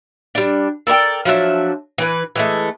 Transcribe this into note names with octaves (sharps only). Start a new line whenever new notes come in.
G3 D4
A4 A#4 D5 G5
F3 F#3 D4 E5
E3 B4
E3 G#3 A3